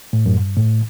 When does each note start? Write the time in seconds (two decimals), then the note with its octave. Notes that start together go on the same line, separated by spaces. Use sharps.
0.13 A2
0.26 F#2
0.36 G2
0.57 A2